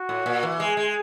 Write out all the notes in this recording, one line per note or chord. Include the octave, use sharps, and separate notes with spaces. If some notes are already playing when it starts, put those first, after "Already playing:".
Already playing: F#4
A2
A#2
E3
G#3 G#4
G#3